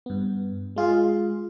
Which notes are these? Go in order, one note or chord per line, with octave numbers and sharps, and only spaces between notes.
G2 B3
G#3 F4 G#4 F5